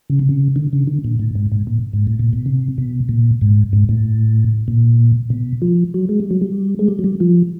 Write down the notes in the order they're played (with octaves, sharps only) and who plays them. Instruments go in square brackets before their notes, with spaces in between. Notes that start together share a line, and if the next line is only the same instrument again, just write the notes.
[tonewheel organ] C#3
C3
C#3
D3
C#3
D3
A#2
A2
G#2
G#2
A#2
G#2
A2
A#2
B2
C3
B2
A#2
G#2
G#2
A2
A#2
B2
F3
F#3
G#3
G3
F#3
G3
G#3
G3
F#3
G3
F3